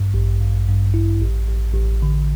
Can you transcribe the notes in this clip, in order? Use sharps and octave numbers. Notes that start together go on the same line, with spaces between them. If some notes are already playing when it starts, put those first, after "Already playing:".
Already playing: A1 G2
A1
G2
G2
E4
A1
A1
A1
D3